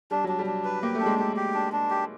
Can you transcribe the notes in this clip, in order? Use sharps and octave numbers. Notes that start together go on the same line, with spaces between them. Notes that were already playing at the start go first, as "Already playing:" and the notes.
G3 D4
F#3 D4
G3
D4
B4
A#3 G4
A3
D4
G#3
A3 G4
G4
D4
D4
G4